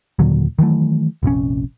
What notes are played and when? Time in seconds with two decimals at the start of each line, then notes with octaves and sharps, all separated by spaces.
0.19 D#2 A#2 D3 F#3
0.59 D#3 E3 F#3 A3
1.23 F1 A#1 F2 C#4